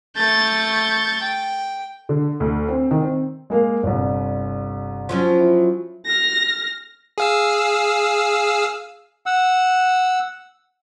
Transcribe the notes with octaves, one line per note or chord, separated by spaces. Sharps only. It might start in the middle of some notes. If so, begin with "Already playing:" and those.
A3 C#6 G6 A6
G5
D3
D2
C4
D#3
C4
G#3 A#3 F5
G1 C2
F3 F#3 C#4
E4
F6 A#6
G#4 F5 E6
F#5 E6